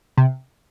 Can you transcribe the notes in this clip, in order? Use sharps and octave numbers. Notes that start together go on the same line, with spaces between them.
C3